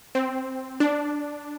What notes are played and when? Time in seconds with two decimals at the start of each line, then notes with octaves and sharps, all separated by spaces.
0.15 C4
0.80 D4